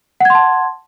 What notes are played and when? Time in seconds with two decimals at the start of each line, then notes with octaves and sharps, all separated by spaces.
0.20 F#5
0.25 G#6
0.30 C6
0.35 A5